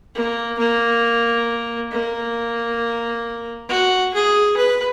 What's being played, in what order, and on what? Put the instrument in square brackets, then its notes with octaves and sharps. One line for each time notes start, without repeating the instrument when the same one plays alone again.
[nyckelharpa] A#3
A#3
A#3
F#4
G#4
B4